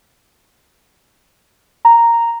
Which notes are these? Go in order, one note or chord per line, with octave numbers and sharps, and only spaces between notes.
A#5